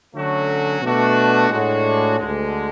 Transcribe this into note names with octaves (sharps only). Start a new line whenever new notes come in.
D3 F#3 A3 C#4 F#4
B2 A3 D4 F#4
A2 G#3 D4 F#4
D2 D3 G#3